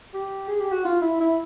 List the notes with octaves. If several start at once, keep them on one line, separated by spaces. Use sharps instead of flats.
G4
G#4
G4
F#4
F4
E4
E4